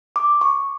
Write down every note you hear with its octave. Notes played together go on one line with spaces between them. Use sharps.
D6
C#6